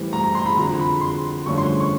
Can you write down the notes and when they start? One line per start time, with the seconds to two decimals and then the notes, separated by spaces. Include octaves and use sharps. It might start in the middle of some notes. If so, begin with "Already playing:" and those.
Already playing: A2 E3 G3 C4
0.13 A#5
0.24 A#5
0.35 C6
0.46 B5
0.57 F2 D3 F3 A#5
0.79 B5
1.01 C6
1.46 G2 D3 F3 A3 C#4 C#6
1.58 C6
1.80 C#6